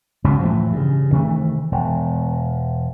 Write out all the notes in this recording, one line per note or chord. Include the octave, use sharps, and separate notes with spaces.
F#1 C#2 F#2 B2
A2 E3 F3
G2 C#3
C3 D#3 E3 A3
E1